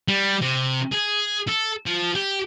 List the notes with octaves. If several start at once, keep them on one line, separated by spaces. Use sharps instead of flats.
G3
C3
G#4
A4
F3
G4